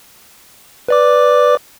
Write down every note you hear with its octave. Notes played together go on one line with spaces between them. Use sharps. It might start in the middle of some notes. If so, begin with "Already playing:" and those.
B4 D5 D6